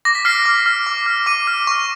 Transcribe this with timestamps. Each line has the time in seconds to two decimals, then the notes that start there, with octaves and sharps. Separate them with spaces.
0.05 D6 A#6
0.15 B6
0.25 F6 C7
0.46 D6
0.66 F6
0.87 D6
1.06 F6
1.26 D6 D#7
1.47 F6
1.67 C#6